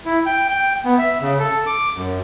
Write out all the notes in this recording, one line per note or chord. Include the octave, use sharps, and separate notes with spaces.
E4
G5
G5
B3
E5
C#3
A4
D6
F#2